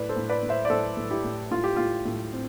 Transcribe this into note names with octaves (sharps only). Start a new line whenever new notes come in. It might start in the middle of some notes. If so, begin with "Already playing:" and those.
Already playing: A2 B4 D5
A4 C5
A2
B4 D5
A2
C5 E5
D5
A2 A4 C5
A2
E4 G4
A2
A2 F4
G4
A2 F4
A2
C4